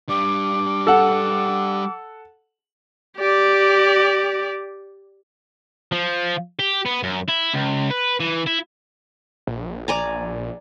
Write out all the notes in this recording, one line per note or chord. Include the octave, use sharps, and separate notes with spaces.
G3 D4 D6
A4 F#5
G4 D5
F3
G4
B3
F#2
E4
C#2
B4
E3
E4
A#1
D5 G#5 A#5